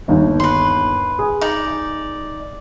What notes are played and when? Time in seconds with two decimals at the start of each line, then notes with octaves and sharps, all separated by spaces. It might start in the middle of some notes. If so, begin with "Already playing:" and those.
0.08 G1 D#2
0.40 B4 C6
1.19 G#4
1.41 D#4 D5